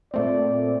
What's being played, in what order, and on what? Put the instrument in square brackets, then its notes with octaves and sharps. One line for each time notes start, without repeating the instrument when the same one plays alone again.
[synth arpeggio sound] A#2 A3 C4 [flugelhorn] D5